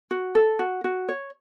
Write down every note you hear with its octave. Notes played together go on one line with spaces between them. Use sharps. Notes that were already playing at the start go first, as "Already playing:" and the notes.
F#4
A4
F#4
F#4
C#5